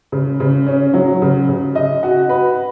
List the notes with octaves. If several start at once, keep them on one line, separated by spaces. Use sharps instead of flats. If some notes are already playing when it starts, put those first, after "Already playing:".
C#3
C#3
C#4
F#3
C#3
C#3
D#5
F#4
B4